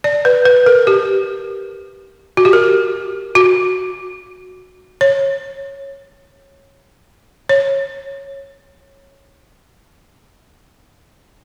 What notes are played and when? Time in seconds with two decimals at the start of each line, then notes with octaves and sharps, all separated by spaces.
0.04 D5
0.25 B4
0.45 B4
0.66 A#4
0.87 G4
2.37 F#4
2.45 G4
2.53 A#4
3.35 F#4
5.01 C#5
7.49 C#5